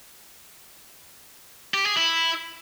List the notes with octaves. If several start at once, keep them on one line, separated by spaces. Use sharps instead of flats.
G4
G#4
E4